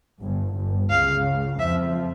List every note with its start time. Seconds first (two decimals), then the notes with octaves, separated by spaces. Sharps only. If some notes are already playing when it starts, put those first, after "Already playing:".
0.21 G1 G2
0.56 G1 G2
0.90 C#2 C#3 F5
1.59 F2 F3 E5